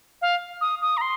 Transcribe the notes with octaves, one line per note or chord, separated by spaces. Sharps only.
F5
D#6
D#6
A#5
C6